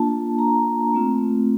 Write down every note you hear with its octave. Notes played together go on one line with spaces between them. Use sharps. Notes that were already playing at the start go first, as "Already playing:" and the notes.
Already playing: A#3 D4 F4 A5
A#5
A3 C4 F4